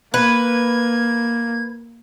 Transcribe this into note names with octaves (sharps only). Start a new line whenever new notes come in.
A#3 B4 G#6